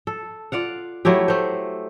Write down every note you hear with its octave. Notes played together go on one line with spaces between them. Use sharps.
A4
F4 D5 F5 F#5
F#3 A3 E4 G4
A3 C5